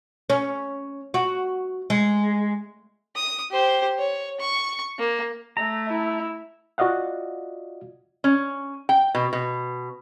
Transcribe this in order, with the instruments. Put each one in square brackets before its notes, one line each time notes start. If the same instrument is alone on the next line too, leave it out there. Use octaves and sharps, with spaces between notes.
[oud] C#4
F#4
G#3
[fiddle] D#6
G4 C5
C#5
C#6
A#3
[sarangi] A3 [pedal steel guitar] A#5
[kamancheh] E4
[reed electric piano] F4 F#4 D5 D#5 F5 F#5
[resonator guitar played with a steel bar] C#4
G5
B2
B2